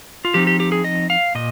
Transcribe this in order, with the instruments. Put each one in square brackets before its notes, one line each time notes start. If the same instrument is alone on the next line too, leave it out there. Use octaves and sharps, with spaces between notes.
[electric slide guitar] F4
F3 C4 D#4 G4
G4
G4
G#4
D#5
F5
A#2 D#5